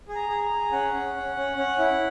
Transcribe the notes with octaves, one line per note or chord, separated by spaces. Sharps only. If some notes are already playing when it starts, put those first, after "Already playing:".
G#4
A#5
G#4
A#5
G#4
C#4 F#5
C#4
C#4
C#4
C#4
E4